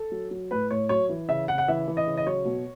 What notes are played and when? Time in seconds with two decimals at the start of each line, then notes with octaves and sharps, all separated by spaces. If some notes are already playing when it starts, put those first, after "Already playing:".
Already playing: A4
0.12 F#3
0.31 F#3
0.51 A2 B4
0.70 A2 C#5
0.89 F#3 C#5
1.09 E3
1.28 C#3 E5
1.48 C#3 F#5
1.58 F#5
1.68 E3 E5
1.88 E3
1.97 D#5
2.07 C#3
2.17 D#5
2.26 F#3 C#5
2.45 B2